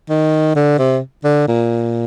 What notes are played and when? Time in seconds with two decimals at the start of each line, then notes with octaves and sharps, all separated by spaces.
0.10 D#3
0.55 D3
0.78 C3
1.24 D3
1.48 A#2